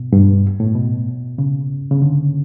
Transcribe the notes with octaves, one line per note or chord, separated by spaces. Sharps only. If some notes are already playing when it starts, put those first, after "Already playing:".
Already playing: B2
G2
A2
B2
C#3
C#3
D3